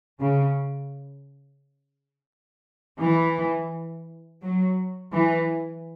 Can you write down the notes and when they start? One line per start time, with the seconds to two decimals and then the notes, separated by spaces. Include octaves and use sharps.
0.20 C#3
3.02 E3
4.43 F#3
5.13 E3